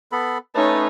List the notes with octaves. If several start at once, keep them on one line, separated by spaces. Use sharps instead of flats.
B3 A4 B5
A3 C#4 D#4 B4 C#5 A5